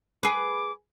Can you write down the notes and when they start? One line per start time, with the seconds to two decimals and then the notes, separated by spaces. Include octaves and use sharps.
0.23 G#4 B4 D6